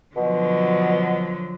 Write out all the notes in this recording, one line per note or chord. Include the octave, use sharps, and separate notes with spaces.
B2 D3 F3 F#3